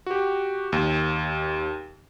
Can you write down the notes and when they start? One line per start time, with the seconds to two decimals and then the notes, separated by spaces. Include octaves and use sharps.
0.06 F#4 G4
0.72 D#2